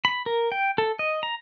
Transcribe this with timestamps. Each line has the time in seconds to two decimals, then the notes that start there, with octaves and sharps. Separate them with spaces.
0.05 B5
0.26 A#4
0.52 G5
0.78 A4
0.99 D#5
1.23 A#5